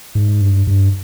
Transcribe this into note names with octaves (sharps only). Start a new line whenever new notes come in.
G#2
G2
G2